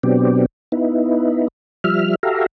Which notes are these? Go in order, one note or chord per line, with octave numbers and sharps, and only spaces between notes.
B2 F#3 B3 C4 D4 G4
B3 D#4 E4
F3 G3 E5 F6
F#4 G4 A4 E5 F5 A#5